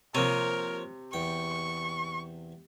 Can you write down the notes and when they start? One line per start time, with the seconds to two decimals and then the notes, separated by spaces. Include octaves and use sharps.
0.15 C3 F3 A#3 A#4 C#5
1.13 E2 G5 C#6